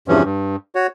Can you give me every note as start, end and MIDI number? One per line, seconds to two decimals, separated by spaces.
0.08 0.23 40
0.08 0.23 43
0.08 0.23 48
0.08 0.23 52
0.08 0.23 53
0.08 0.23 61
0.24 0.56 43
0.75 0.87 66
0.75 0.87 73